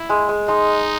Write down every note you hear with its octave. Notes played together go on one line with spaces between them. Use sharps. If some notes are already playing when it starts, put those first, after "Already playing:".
Already playing: E4
G#3
G#3
G#3 D#4